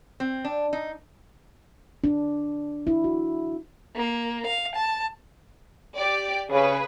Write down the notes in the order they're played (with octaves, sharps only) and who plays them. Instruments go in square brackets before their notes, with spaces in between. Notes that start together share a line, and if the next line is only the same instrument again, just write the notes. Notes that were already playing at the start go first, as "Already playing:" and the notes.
[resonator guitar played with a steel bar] C4
D4
D#4
[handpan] D4
E4
F#4
[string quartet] A#3
F5
A5
[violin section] G4 D5
[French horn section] C#3 [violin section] G#4 B4